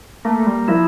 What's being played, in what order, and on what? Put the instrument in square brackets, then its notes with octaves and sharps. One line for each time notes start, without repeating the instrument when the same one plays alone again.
[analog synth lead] A3 [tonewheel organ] A#3
[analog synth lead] G3
[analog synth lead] F3 [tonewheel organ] E4